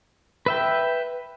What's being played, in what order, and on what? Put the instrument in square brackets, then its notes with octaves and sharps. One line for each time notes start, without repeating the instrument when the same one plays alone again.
[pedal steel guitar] B4 E5 G5